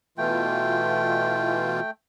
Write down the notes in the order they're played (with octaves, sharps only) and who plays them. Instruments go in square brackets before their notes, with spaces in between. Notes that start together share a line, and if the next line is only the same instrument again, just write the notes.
[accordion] B2 E3 F4 [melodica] A3 G5